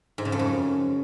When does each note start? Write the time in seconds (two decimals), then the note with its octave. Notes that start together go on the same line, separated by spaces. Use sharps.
0.18 G#2
0.25 C#3
0.32 F2
0.39 F#2